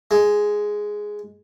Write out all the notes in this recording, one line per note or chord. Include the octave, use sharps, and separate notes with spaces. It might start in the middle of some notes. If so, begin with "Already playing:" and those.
G#3